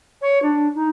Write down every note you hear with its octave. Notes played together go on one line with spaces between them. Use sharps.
C#5
D4
D#4